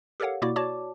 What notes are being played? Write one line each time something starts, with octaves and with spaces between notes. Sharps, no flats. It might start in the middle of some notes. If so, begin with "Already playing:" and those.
G4 A4 A#4 C#5 F5 F#5
B2 A#3 E4 F#4 D5 D6
F#4 C#5 D5 A5 D6